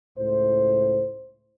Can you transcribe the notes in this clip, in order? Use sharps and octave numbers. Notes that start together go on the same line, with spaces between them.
C#2 A2 C5